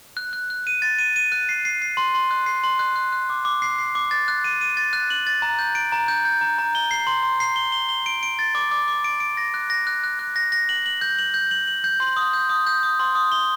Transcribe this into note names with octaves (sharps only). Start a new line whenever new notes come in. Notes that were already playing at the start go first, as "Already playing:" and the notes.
F#6
F#6
F#6
D#7
A6
D#7
D#7
F#6
C7
C7
C7
C6
C6
F#6
C7
C6
F#6
F#6
F#6
D6
D6
C7
C7
D6
A6
F#6
D#7
D#7
A6
F#6
F#7
A6
A#5
G6
D7
A#5
G6
G6
A#5
A#5
G7
C7
C6
C6
C7
G7
G7
G7
D7
D7
A6
D6
D6
D6
D7
D7
A#6
F#6
A#6
F#6
F#6
F#6
A#6
A#6
F#7
F#7
G6
F#7
G6
F#7
F#7
G6
C6
D#6
G6
D#6
G6
D#6
C6
D#6
G7